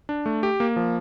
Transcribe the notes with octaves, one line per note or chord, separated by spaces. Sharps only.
D4
A3
G4
A#3
F3